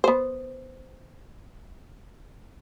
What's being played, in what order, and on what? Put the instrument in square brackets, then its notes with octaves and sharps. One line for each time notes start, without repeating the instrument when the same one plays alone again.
[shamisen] B3 C5